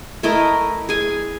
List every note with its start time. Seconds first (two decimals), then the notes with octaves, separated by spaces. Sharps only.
0.23 A3 E4 A#4 D#5
0.89 G#4 G#5